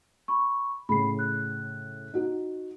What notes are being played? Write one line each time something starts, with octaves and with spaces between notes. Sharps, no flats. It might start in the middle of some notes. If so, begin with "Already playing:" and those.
B5 C#6
A2 C#3 B5 C7
F#6
D#4 F#4